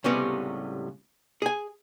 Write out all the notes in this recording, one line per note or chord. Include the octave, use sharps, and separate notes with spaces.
C#2 A2 C3 G3 B3 C#4
G#4 G#5